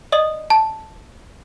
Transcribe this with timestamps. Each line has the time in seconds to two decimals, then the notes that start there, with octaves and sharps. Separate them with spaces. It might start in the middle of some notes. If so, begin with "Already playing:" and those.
0.12 D5 D#5 D#6 F#7
0.50 A5